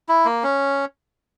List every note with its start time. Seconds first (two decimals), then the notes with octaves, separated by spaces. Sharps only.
0.09 E4
0.25 A#3
0.43 C#4